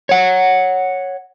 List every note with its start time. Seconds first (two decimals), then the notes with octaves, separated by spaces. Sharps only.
0.09 C#5 F#5